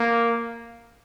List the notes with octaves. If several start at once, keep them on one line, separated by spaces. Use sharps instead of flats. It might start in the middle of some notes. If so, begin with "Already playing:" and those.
Already playing: A#3